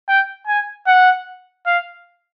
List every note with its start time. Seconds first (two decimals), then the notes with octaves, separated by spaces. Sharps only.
0.08 G5
0.47 G#5
0.87 F#5
1.66 F5